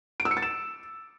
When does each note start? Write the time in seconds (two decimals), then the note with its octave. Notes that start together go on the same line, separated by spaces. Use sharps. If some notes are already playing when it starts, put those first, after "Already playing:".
0.20 D7
0.25 E6
0.31 C#7
0.37 A6
0.42 E7